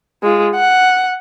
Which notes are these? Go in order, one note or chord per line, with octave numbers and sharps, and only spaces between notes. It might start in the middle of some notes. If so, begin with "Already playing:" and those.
G#3 F4
F#5